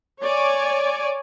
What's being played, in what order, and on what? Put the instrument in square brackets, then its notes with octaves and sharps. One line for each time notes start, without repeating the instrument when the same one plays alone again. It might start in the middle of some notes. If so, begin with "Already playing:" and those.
[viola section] C#5 D5 G#5